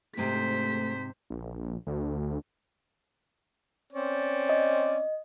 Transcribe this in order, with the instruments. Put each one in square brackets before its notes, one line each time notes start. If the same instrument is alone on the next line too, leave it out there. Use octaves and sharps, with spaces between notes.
[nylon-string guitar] G#2 C3 C4 [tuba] A3 [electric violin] C5 B6
[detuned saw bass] A#1
D2
[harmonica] C4 C#4 D5
[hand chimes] D#5